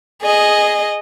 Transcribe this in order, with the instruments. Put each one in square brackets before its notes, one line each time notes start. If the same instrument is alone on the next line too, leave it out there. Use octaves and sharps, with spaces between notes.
[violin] G#4 D#5